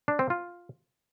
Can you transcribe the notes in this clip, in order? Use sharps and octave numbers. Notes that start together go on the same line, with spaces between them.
D4
C4
F4